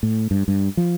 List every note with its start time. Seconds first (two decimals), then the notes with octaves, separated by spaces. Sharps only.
0.03 A2
0.31 G2
0.48 G2
0.77 F3